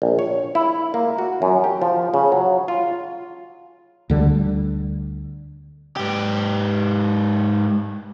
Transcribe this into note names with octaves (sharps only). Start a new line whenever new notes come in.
A#1
C#5
E4
A#3
F#4
F#2
G4
F3
C#3
F#3
F4
D2 D3 G3
G#2 G4